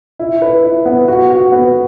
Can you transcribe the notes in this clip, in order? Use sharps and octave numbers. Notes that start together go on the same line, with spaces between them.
E4
B4
E4
B3
F#4
F#4
B3